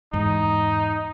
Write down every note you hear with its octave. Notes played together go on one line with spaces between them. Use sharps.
E2 G#2 D#4